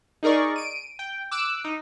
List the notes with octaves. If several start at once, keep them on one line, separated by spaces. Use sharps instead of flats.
D#4 G#4 A#4 D5 C#6
D7 D#7
G5
D6 E6 F#6
D#4